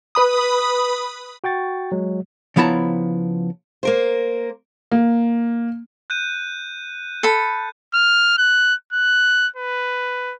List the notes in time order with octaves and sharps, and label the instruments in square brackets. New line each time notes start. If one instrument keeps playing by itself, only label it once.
[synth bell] B4 B5 D#6
[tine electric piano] F#4 G5 C#6 A6
F#3 G#3
[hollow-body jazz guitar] C#3 F3 B3 E4 A5 A#5
[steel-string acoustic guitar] A#3 A#4 C5
[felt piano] A#3
[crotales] F#6 G6 D#7
[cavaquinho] A4 B5
[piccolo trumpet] F6
F#6
F#6
B4